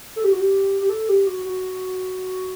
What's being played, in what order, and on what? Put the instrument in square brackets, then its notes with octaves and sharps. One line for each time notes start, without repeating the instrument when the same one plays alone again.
[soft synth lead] A4
G4
F#4
G4
G4
A4
G4
F#4
F#4